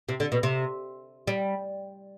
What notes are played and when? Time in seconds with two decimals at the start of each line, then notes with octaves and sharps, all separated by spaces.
0.09 C3
0.20 D3
0.32 B2
0.43 C3
1.27 G3